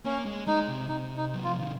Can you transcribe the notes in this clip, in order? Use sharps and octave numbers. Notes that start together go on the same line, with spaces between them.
A#3 C#4
G#3
G#3 D#4
C3
C3 D#4
D#4
F#3
F3 F4
D#3